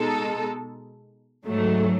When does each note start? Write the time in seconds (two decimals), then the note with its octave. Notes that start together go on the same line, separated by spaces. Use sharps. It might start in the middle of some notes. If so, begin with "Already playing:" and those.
Already playing: B2 G#3 D#4 A4
1.46 G#2 F#3 A3